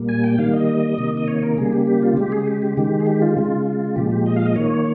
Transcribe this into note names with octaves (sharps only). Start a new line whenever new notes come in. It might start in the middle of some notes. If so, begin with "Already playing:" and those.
Already playing: A#2 G3 A#3
G#5
G5
D#3 G3 A#3 F5
D#5
C3 D#3 A#3
D#5
C#5
A#4
C#3 G3 A#3 G#4
G4
G4
F4
C#3 G#3 G4
G#4
G4
G4
D#3 G#3 G4
G#4
G4
F4
C#3 G#3
A#2 F3 G#3 G4
G4
D#5
F5
D#5
D#3 A#3 C#5